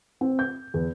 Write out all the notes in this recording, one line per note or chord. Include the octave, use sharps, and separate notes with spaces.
C4
G6
E2